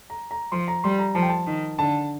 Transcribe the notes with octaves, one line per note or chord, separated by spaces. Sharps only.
A#5
A#5
F3 C6
A#5
G3 C6
A#5
F3 A5
G5
A5
D#3
D3 A5